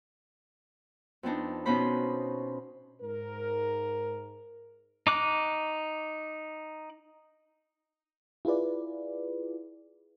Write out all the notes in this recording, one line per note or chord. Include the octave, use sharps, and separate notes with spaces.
F2 B3 D4 D#4
B2 B3 C#4 D#4 C5 B5
G#2 A#4
D#4 D6 F#6
E4 F4 G#4 B4 D5